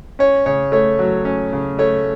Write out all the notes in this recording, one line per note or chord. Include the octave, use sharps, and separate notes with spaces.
C#4 C#5
C#3 C#5
A3 C#5
F#3
C#4
C#3
A3 C#5